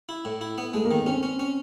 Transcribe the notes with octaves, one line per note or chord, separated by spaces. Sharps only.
E4
A2
E4
B3
G#3 A3
A#3
D#3
B3
C4 C#4
C#4
C#4